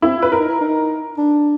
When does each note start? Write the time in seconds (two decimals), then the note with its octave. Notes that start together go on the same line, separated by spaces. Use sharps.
0.02 C4 E4
0.17 F4
0.22 B4
0.31 E4 A#4
0.40 D#4
0.48 E4
0.61 D#4
1.18 D4